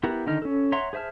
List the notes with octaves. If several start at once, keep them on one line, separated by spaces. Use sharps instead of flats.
B3 E4 G4 A#4 F#5
D3 D#3 D#4 F6
C#4 A4
C#5 E5 F#5 A#5 C6
G#4 C5 E5 A5 F6